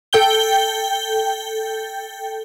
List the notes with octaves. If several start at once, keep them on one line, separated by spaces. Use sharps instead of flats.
A4 G5 G6 G7